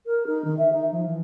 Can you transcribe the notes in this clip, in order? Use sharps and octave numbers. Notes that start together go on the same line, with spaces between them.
A#4
D#4
D#3
E5
D#4
F3
E3